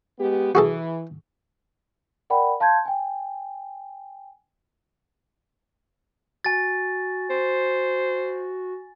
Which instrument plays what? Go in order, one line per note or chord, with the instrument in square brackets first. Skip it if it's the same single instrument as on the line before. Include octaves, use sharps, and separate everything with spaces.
[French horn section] G#3 B3 G4
[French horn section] E3 [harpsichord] F#4 G#4 A4
[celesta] A#4 D5 F#5 G5 B5
F5 A5 C6 G6 G#6
G5 G#5
[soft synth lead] F#4 [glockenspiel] G#5 A6
[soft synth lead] F#4 [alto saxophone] C5